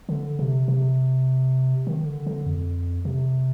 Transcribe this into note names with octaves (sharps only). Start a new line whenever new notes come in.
D3
C3
C3
D#3
D3
D3
F2
C3